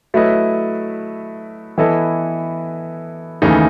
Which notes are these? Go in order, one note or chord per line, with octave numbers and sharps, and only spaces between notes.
F#3 A3 E4 B4 D#5
E3 B3 E4 A4 D#5
D#2 C#3 E3 A3 D#4